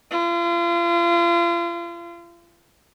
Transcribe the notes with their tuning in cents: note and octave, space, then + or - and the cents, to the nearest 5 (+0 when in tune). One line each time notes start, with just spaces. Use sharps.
F4 -35